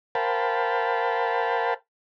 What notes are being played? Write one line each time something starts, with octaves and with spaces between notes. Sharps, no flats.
A#4 C5 F5 G5 A5 B5